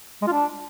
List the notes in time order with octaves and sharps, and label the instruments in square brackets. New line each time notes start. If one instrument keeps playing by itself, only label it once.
[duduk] G#3
F4
D4